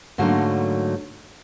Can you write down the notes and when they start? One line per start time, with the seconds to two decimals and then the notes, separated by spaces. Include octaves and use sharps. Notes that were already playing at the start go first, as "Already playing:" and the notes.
0.18 G#2 D3 F#3 A3 A#3